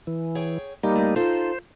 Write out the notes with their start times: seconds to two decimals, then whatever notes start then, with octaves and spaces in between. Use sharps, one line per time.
0.07 E3
0.35 G#4 C#5 G5
0.83 G3 A#3 D#4 G4
0.96 A3
1.16 D#4 F4 A4 C5